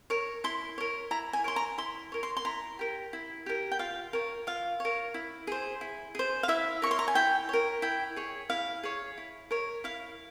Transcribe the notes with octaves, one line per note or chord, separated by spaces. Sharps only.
A#4 C#5
E4 C6
A#4 C#5
E4 A#5
G#5
A#4 C#5 C6
A#5
E4 C6
A#4 C#5
C6
C6
E4 A#5
G4 A#4
E4
G4 A#4
G5
F4 F5
A#4 C#5
F4 F5
A#4 C#5
E4
G#4 C5
E4
G#4 C5
F5
E4 E5
A#4 C#5 C6 C#6
A#5
G#5
E4 G5
A#4 C#5
E4 G5
G#4 C#5
E4 F5
G#4 C#5
E4
A#4 C#5
E4 F5